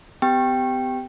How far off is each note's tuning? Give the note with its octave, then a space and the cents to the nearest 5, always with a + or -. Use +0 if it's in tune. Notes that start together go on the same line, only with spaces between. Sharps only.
B3 +45 G4 +0 G5 +0